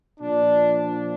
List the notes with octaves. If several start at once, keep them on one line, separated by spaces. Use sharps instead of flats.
A#2 F3 D4
D4